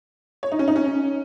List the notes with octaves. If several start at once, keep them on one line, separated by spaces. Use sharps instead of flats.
C#5
D#4
C#4
D#4
C#4